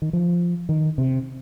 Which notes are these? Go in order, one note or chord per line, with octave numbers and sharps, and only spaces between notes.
D#3
F3
D#3
C3